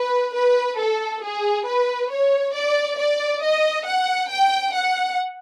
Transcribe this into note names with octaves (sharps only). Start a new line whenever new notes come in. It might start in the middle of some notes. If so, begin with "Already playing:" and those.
Already playing: B4
B4
A4
G#4
B4
C#5
D5
D5
D#5
F#5
G5
F#5